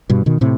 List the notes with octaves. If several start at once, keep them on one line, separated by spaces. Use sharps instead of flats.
G2 B2
B2 D#3
A2 C3